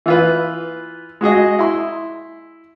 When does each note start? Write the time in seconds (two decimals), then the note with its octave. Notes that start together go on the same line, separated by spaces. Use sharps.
0.06 E3 F4 B4
1.21 G#3 F#4 G#4 D#5
1.59 E4 C6